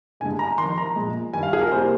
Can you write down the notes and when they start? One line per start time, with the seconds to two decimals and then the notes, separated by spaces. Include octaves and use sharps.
0.20 G2 D3 G#3 G#5
0.39 A#5
0.58 F1 F2 D#3 C6
0.78 A#5
0.96 A#1 A#2 G#3
1.33 G2 D#3 G3 G#5
1.43 F5
1.53 G#4
1.61 A#4
1.71 C2 C3 G3 A#3 C5